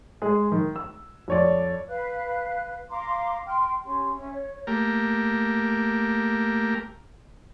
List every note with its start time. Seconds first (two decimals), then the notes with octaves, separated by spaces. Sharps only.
0.22 G#3 G#4
0.52 D#3
0.76 E6
1.28 F2 C#5 D5
1.89 B4 F5 F#6
2.89 F5 A#5 C6 D6
3.45 G5 C6 F6
3.84 C#4 G4 C6
4.16 C#4 E5
4.30 C#5
4.67 A3 A#3 G4 A#4